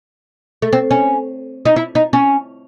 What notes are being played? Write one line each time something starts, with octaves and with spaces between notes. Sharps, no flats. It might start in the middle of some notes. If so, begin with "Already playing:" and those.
A3
C4
C#4
D#4
E4
D#4
C#4